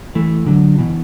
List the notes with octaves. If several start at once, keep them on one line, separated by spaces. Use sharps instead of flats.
E3 A3
D3 F#3
B2 E3